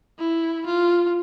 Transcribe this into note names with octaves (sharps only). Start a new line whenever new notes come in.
E4
F4